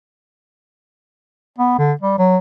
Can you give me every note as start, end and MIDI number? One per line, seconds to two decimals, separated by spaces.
1.58 1.76 59
1.78 1.93 50
2.01 2.17 55
2.18 2.37 54